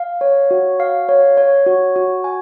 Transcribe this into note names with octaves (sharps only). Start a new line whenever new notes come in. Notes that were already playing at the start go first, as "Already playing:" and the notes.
Already playing: F5
C#5
F#4
F5
C#5
C#5
F#4
F#4
G#5